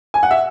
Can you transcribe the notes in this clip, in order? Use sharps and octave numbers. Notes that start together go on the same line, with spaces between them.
G#5
F#5
E5